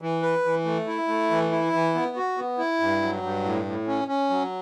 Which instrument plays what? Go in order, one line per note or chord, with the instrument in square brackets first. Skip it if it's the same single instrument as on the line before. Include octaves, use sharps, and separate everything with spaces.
[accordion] E3
B4
E3
A3
E4
A3
E3
E4
E3
B3
F#4
B3
E4
G2
F#3
G2
A2
A2
C#4
C#4
F#3